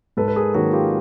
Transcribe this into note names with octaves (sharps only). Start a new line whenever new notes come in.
G#2 A4 B4
B4
G#4 A#4
D#3 F#3 A#3 C#4 F#4 G#4
F4 G4